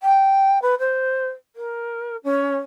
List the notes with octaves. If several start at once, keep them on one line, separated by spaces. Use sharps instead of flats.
G5
B4
C5
A#4
C#4